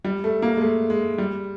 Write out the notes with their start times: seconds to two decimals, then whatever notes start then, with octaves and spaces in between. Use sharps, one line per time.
0.05 G3
0.24 A3
0.42 A#3
0.57 G#3
0.61 A3
0.90 G#3
1.18 G3